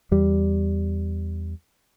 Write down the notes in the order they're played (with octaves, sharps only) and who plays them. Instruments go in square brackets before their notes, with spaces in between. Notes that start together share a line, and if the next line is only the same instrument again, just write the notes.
[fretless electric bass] E2 G3